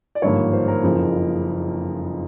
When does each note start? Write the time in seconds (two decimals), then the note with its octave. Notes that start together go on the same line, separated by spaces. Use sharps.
0.15 D5
0.22 G#1 G2 D3 F3 A#3 C#5
0.53 C5
0.68 A#4
0.83 F#1 F2 C#3 F3